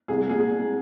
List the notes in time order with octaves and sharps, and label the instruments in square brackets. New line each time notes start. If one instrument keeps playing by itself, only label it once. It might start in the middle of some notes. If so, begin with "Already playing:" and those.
[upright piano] C2 G#4
A#2 G#4